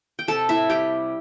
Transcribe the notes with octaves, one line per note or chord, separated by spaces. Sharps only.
G5
C3 A4 A5
E4 E5
G3 G4 G5